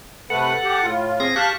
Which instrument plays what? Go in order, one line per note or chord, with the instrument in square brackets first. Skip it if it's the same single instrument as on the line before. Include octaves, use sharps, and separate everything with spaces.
[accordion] C3 A3 B4 [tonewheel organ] A4 F#5
[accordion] G4
A2 F4
[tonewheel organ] C4 G#4 A#6
[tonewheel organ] G4 C#6 F#6 [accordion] F5 A5